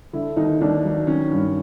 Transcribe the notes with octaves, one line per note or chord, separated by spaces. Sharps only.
D3 E4
D#2 D#4
D#2 D4
F#3
D#3 C#4
G2